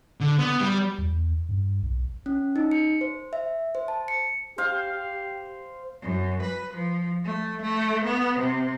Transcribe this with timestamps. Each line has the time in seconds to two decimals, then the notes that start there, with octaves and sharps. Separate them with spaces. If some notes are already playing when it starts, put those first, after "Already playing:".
0.21 D3
0.39 B3
0.60 G3
0.99 E2
1.49 G2
1.83 B1
2.26 C#4
2.56 D#4
2.71 C#7
3.01 C5
3.33 E5
3.75 C5
3.88 A5
4.08 C#7
4.58 G4 C5 F5
6.02 F#2
6.42 B4
6.73 F3
7.25 A3
7.62 A3
8.05 B3
8.39 C3